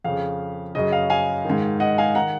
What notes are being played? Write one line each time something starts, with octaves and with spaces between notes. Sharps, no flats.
F2 C#3 F5
F#2 C#3 D#5
F5
F5 G#5
G#2 D#3
D#5 F#5
F5 G#5
D#3 F#5 A#5